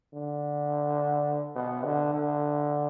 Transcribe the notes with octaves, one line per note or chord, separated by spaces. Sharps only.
D3
B2
D3
D3